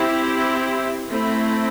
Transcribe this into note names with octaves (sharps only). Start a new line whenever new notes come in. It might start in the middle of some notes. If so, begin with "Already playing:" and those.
Already playing: C4 E4 G4
A3 C4 E4